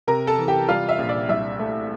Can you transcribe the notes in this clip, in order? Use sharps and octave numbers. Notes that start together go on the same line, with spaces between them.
C3 A#4 A#5
A4 A5
E3
G4 G5
G3 F4 F5
E5
A#1
D5
C2 E5
A3